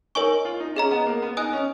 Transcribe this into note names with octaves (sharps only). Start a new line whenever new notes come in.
D#4 A#4 C#5 G#5 C#6
F4
D#4
C#4 G#4 D#5 A#5
B3
A#3
B3
D#4 D#5 G#5 D#6 F#6
C#4